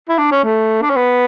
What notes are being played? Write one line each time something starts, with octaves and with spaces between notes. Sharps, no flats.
E4
D4
C#4
A3
D4
C#4
B3